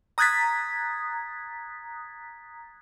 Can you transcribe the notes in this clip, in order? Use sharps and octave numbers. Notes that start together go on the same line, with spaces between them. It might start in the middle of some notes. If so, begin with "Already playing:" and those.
A#5 D#6 F#6 G#6 A6 B6